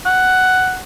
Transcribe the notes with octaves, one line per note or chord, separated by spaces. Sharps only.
F#5